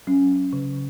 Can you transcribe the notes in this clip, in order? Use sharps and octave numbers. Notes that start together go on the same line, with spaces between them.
F#3 C#4
C#3